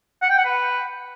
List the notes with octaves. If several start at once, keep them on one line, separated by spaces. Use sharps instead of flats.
F#5
G5
F#5
B4